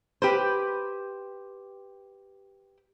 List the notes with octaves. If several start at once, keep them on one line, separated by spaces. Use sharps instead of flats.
G4 B4 C5